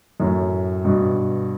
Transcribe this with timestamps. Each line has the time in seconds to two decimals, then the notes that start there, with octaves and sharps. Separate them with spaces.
0.20 F#2 A2
0.84 G2 B2